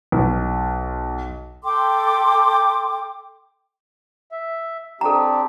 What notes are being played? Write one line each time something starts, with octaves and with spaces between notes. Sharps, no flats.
B1
A4 G5 C6 D6
E5
C4 D4 G4 A4 A#5